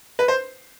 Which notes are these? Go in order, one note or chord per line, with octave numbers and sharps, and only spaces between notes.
B4
C5